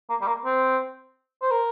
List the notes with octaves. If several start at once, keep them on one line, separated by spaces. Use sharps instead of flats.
A#3
G3
A#3
C4
C5
A#4